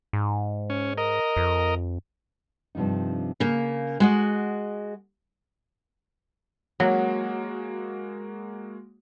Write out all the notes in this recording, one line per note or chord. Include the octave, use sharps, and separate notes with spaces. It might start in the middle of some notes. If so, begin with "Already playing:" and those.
G#2
C#4
A#4 D#5
F2
G2 C3 F3 D4 D#4
C#3 A#3
G#3 F#4 D#5
F#3 G#3 A#3 F#4